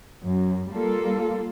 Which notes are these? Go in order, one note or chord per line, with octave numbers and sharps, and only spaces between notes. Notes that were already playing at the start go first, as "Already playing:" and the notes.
F#2
G3 A#3 F4 A4